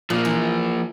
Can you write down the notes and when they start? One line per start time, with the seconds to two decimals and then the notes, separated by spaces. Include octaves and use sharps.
0.10 A#2 F3 A#3
0.25 E3